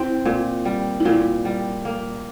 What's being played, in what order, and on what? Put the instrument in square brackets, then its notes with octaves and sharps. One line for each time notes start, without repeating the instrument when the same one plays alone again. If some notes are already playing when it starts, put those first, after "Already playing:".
Already playing: [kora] C4 [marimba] E4
[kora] A#2
G3
[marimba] E4
[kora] A#2 [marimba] F4
[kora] G3
A#3